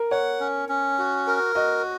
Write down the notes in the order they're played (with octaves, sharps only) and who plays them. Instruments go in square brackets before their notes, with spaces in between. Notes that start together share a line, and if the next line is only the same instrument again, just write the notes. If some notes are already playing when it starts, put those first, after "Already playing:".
Already playing: [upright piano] A#4
[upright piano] C#5 [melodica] F#5
[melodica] C#4
C#4
F#4
A#4
[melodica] F#4 [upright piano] D#5